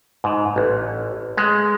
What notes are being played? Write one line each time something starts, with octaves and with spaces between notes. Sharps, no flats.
G#2
A1
G#3